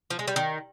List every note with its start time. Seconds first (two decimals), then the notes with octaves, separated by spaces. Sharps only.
0.10 F3
0.19 G#3
0.28 G3
0.36 D#3